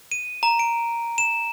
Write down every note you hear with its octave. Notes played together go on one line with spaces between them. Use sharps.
D#7
A#5
D7
E7